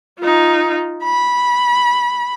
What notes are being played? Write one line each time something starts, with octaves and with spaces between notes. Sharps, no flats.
D#4 F4
B5